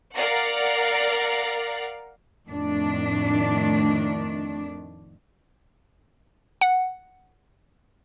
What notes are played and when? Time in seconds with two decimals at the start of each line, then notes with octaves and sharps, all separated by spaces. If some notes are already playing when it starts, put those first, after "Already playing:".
0.16 A#4 D5 F5 F#5 A#5
2.48 F2 A2 D#3 A3 D4
6.61 F#5